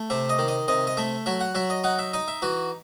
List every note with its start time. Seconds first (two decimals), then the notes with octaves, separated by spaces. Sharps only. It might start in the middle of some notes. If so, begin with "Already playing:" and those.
Already playing: A3
0.10 C3 E5
0.29 D#5
0.38 D#3
0.48 D#5
0.68 C3 D#5
0.87 D#5
0.97 A3 E5
1.26 F#3 E5
1.41 F#5
1.55 F#3 E5
1.70 D#5
1.84 D#4 F#5
1.99 E5
2.13 D#4 D#5
2.28 E5
2.42 E3 F#4